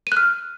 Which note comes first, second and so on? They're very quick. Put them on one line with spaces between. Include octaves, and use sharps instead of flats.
D#7 F#6 F6